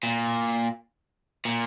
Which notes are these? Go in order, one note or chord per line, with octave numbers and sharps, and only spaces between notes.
A#2
A#2